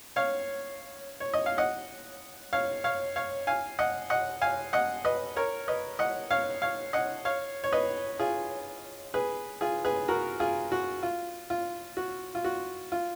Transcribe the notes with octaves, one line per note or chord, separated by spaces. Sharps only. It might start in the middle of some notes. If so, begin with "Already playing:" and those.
C#5 F5
C#5
D#5
F5
D#5 F#5
C#5 F5
C#5 F5
C#5 F5
F5 G#5
D#5 F#5
D#5 F#5
F5 G#5
D#5 F#5
B4 D#5
A#4 C#5
B4 D#5
D#5 F#5
C#5 F5
C#5 F5
D#5 F#5
C#5 F5
C#5
B4 D#5
F4 G#4
G#4 B4
F4 G#4
G#4 B4
F#4 A#4
F4 G#4
F#4
F4
F4
F#4
F4
F#4
F4